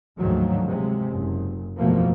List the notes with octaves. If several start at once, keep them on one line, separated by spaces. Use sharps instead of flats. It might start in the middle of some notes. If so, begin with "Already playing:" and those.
D2 G#2 D#3 F3 F#3
C3 G#3
F#1
F#1 E2 B2 F3 A3 A#3